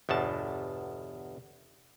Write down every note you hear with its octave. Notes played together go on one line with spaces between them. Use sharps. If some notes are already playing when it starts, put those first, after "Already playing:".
G1 E2 B2 A5